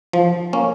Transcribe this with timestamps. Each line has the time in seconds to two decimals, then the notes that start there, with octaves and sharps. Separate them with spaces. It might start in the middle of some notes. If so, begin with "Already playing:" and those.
0.13 F3
0.53 A#3 C#4